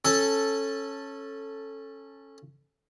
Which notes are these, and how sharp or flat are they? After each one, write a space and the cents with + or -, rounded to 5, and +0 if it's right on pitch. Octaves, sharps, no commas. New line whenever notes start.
C#4 -15 A4 +0